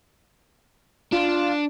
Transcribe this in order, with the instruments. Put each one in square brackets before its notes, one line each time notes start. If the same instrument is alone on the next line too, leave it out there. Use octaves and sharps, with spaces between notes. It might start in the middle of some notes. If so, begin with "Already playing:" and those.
[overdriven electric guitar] D4 [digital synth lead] F4